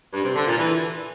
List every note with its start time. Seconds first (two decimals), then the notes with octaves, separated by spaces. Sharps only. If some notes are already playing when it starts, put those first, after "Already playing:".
0.13 G2
0.24 C3
0.35 D3
0.46 A#2
0.57 E3